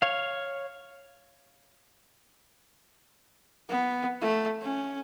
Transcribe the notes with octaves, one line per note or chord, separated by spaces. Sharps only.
C#5 F5
B3
A3
C#4